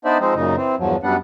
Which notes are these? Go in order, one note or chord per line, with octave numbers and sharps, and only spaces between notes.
B3 D4 D#4 C5 D5 E5
F3 G#3 C4 D#4
F#2 A#2 C#3 D#4
E3 C4
E2 G2 F3 F#3
F#2 G3 B3 D4 F#5